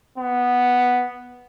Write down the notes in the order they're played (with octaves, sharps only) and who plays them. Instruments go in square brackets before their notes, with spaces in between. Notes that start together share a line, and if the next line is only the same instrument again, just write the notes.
[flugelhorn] B3